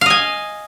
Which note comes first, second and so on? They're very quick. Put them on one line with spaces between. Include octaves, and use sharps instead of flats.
F5 D#5 G#5